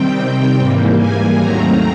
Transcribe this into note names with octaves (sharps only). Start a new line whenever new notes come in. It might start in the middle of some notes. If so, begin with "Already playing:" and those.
Already playing: C3 D#3 G3 C4 G5
G5
G#2 E3 G3 A#3
G#5
D#2 D#3 F#3 A3 C4 A#5